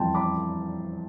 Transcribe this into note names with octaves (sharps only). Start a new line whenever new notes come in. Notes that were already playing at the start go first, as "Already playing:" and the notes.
Already playing: F2 E3 G3 G5 A5 B5 C6
B5 D6